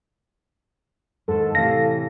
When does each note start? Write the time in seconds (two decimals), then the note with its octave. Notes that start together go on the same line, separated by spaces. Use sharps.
1.28 G#2 D#3 A4
1.55 A2 C3 E3 F5 A#6